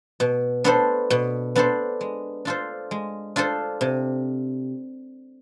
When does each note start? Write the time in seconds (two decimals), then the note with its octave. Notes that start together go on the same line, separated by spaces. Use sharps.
0.20 B2
0.64 B3 D4 A4 C5
1.10 B2
1.55 B3 D4 A4 C5
2.01 G#3
2.45 D4 F4 A4 C5
2.91 G#3
3.36 D4 F4 A4 C5
3.81 C3